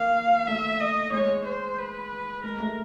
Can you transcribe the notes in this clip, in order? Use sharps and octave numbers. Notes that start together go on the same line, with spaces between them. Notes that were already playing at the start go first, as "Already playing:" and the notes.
Already playing: A#3 F5
A3 E5
D#5
G#3 C#5
C5
B4
G#3 A#4
A3